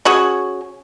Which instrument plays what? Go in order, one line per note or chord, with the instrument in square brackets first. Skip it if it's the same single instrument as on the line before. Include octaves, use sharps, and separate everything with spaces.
[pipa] C#4 F#4 G#4